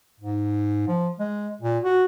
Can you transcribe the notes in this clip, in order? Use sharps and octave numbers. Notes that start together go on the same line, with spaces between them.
G#2
F3
G#3
A#2
F#4